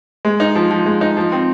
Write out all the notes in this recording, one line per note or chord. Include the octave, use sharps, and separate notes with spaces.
G#3
D#4
F3
F3
G#3
D#4
F3
C4